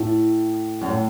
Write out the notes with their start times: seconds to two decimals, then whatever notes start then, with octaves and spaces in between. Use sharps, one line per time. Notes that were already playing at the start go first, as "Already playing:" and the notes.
Already playing: A2
0.81 F#2
0.88 A2